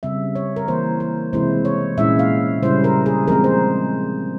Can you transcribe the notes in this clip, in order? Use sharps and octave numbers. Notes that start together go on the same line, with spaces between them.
C#3 G3 C4 E5
C#5
A#4
E3 A#3 E4 C5
A#4
C3 E3 G#3 C4 E4 C5
C#5
A#2 G#3 C#4 E4 E5
F5
C#3 G3 C#4 E4 C5
A#4
G#4
F3 G#3 C4 A#4
C5